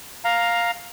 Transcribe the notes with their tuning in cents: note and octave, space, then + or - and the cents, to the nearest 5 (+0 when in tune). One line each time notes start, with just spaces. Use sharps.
F5 +5 A#5 +0